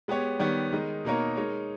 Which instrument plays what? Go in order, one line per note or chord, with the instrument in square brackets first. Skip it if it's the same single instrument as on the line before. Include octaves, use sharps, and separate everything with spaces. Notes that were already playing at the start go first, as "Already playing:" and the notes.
[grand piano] G#3 B3 G4 C#5
D#3 G3 B3 G4 C#5
D#3 G#3 D#4
B2 A#3 D#4 A#4 C#5
G#3 D#4 A#4 C#5